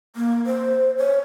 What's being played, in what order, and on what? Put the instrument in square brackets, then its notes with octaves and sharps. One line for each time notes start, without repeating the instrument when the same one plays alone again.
[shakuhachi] A#3
C5
C#5